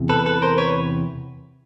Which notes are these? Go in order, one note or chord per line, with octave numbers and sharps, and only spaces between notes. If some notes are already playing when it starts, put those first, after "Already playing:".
Already playing: E2 C3
A4 B4
A4 B4
A#4 C5
B4 C#5